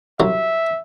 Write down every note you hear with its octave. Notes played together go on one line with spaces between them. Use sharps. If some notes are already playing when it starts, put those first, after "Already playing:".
C2 F#3 E5